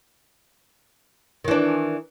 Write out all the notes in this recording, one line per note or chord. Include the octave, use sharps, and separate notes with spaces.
D#3 E3 D4